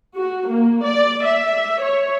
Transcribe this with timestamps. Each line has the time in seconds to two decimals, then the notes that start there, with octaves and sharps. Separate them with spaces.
0.17 F#4
0.48 A#3
0.85 D5
1.25 E5
1.82 C#5